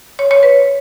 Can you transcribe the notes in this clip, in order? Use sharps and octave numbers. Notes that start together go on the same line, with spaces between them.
C#5
C#5
B4